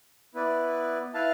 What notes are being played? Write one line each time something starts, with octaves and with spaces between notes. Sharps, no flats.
B3 E4 B4 D5
E4 B4 F5 A5